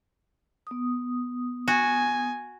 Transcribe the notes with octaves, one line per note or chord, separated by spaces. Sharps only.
B3 D#6
F#4 G#5